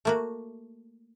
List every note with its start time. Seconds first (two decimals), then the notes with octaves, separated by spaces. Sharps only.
0.05 A3 A#3 F#4